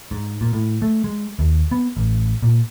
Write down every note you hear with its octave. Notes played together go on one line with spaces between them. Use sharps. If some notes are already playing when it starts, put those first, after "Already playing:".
G#2
A#2
A2
A3
G#3
D#2
B3
A1
A#2